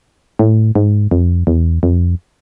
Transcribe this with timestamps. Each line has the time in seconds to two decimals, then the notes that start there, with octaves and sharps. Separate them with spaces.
0.39 A2
0.75 G#2
1.11 F2
1.47 E2
1.83 F2